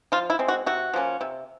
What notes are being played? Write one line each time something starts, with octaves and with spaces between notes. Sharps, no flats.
F3 F4
E4
G#3 C4
F#4
C3 F#4
F3 A#3 C#4
C3